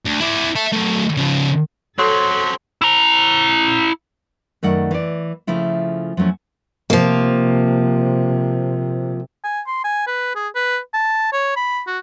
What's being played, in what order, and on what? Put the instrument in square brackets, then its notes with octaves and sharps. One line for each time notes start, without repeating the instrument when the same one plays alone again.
[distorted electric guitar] D2
E4 D5
E5 A5
F#3 A3
C#3 F3
[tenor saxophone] F#3 [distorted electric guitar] C4 C#4 [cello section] A4 [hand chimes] C#5 C6 D#6
[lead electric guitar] E4 A#5
[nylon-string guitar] F#2 D#3 A3 D5 F#5
E3 D5
C#3 F3 A3 E4 F4
F3 F#3 A3 C#4
[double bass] C3 [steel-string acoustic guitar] F3 A#3
[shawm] G#5
C6
G#5
B4
G#4
B4
A5
C#5
B5
F#4